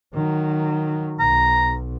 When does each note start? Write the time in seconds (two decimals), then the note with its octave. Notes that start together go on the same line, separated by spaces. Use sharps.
0.14 D#3 F#3
1.20 B1 A#5